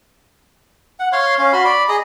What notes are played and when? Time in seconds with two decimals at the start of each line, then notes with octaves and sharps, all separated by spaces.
1.00 F#5
1.13 C#5 F5 C6
1.39 C#4 F5
1.53 F#4 B5 C6
1.64 D5 B5
1.89 G#4 D#5 A#5